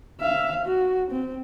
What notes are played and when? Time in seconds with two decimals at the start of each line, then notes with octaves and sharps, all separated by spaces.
0.20 E5 F5
0.66 F#4
1.11 C4